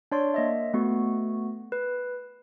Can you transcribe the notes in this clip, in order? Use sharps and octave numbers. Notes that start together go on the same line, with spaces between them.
D4 C#5 D5 C6
A#3 D#5 E5
A3 B3 F#4
B4